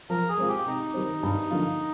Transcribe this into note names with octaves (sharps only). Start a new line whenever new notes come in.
F3 A#4
G#4
G#3 C4 F4
G4
C3 D#4
D#3 G3 C4
G2
D3 F3 A#3 F4